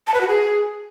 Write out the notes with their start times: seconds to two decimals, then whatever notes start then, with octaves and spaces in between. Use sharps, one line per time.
0.07 A5
0.14 B4
0.21 F#4
0.28 G#4